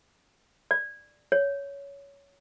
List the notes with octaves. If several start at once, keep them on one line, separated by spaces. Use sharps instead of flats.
D5
C#5